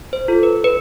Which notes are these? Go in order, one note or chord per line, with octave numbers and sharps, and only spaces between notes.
C5
F4 A4
B4
B4